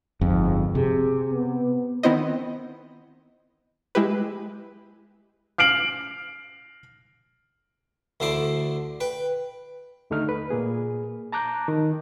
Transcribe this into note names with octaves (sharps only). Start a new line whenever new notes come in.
G1 F2 G#2
C3 G#4
B3
D#3 B3 C4 E4 C5 D#5
G#3 E4 G4 B4
F6 C7 D7 F#7
D2 D3 E4 C5 D6
B4 G5
D#2 D3 A3 D#4 F6
B4
A#2 A#3 G#4
A5 A#5 D6 F#6 G6
D#3